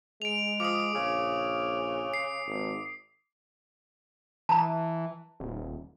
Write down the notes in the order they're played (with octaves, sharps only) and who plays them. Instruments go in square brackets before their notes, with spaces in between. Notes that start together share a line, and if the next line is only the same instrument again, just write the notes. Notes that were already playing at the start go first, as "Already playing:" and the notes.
[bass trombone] G#3 [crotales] D7 F7
[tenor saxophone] F3 [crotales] D6 D#6
[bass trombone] A#1 [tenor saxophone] C#3
[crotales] C7
[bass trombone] G#1
[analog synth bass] E3 [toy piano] A5 A#5
[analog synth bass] D#1